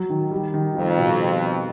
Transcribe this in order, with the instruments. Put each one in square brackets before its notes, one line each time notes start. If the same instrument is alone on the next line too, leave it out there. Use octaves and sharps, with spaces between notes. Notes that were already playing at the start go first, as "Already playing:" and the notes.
Already playing: [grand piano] F#3
D#3
G3
D#3
[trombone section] F2 [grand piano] G3
[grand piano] B2